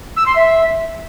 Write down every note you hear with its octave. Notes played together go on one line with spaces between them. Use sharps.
E6
C6
E5